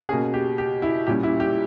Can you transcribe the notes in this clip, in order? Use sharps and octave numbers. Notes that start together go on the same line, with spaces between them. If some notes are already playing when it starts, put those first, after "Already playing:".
B2 A#3 C#4 G#4
G4
G4
E4
A#2 G3 C#4 G4
E4
G4